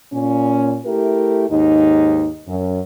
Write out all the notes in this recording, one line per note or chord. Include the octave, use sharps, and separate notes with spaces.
A#2 C#4
A3 E4 G4 A#4
D#2 G#2 D#4
F#2